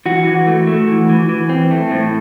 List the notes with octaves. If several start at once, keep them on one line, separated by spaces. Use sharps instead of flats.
E3 F#4
E3
A3
A3
E3
E3
E3
C4
A3
A2